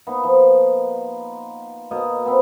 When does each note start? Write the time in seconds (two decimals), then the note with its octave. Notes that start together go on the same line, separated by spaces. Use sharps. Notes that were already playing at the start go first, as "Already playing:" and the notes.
0.07 A#3 B3 D#4
0.24 F3
1.91 B2 A#3 D#5
2.26 B3 C4